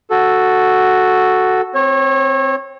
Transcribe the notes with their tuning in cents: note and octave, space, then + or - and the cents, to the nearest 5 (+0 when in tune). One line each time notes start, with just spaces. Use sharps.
F#4 +0 A4 +0
C4 +0 C#5 -30